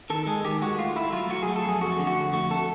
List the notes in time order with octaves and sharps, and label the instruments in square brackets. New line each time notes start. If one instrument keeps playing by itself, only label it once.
[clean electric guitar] D#3 A4
G#3 G#4
D#3 G4
G#3 F#4
A3 F4
A3 E4
F#3 F4
F#3 F#4
G#4
A3
A4
F2 G#4
A3 F#4
D3
F#4
F2
A3 F#4
A3 A4